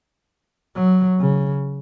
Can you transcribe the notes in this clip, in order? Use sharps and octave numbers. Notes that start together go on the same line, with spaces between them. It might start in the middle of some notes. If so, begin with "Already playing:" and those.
F#3
C#3